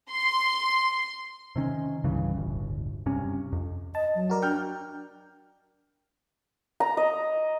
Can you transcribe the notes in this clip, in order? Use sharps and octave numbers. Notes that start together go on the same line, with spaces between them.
C6
C3 D#3 C#4
C2 G2 C#3 E3
D1 G1
F#1 G2 C3 C#4
F2
D#5 A5
F#3
F#4 A#4 D5
D4 G5 F6 G6
A#5
D#5